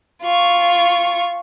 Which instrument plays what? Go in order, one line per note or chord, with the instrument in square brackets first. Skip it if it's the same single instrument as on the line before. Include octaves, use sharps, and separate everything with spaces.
[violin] F4 C#6